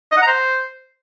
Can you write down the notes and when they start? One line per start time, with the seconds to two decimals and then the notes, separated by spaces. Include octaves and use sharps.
0.12 D#5
0.17 F#5
0.22 A#5
0.27 C5